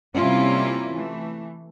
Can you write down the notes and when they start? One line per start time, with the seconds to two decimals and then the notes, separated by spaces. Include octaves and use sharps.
0.16 C3 G3 A#3 C#4 E4 F4
0.91 E3 A3